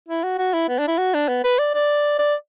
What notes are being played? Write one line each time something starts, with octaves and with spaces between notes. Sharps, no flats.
E4
F#4
F#4
E4
B3
D4
E4
F#4
D4
B3
B4
D5
D5
D5